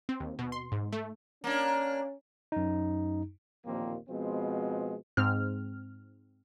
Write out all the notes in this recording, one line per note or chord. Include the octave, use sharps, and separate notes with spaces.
C4
D#2
B2
C6
G#2
A3
A#3 C#4 D4
F#2 D#4
A1 D#2 A#2 F3 A#3 C4
B2 F3 G#3 B3 C4
G#2 C4 F6